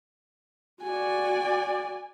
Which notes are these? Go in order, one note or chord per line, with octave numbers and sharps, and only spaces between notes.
F#4 D5 G#5